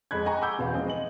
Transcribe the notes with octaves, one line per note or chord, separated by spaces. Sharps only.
F2 G#3 G#4 B5 F#6 G#6
D#5 G5 G#5 A#5 C#6
F#5 B5 D6 E6 G6
E2 B2 E3 F5
F3 G#3 B3 C4 D#4
D#5 F#7